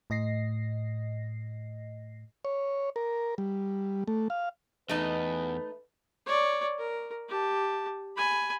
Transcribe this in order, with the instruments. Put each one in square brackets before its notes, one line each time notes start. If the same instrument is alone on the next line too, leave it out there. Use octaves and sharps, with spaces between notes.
[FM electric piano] A2 D#5 A#6 C7
[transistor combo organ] C#5
A#4
G3
A3
F5
[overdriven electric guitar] E2 [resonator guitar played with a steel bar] A3 D#4 [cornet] B4
[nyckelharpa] C#5 D5
A#4
G4 A5
G#5 B5